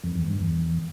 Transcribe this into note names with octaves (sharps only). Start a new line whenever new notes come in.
F2
E2
G2
E2